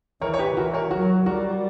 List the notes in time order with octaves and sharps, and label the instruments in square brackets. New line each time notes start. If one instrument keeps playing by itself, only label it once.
[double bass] E3 [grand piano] A#4 C#5
[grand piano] C#5
G4 B4
[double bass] E3 [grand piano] F#4 A#4
[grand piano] A#4 C#5
[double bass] F#3 [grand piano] F#4 A#4
[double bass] G3 [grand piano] F#4 A#4